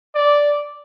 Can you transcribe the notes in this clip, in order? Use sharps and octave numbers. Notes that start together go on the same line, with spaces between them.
D5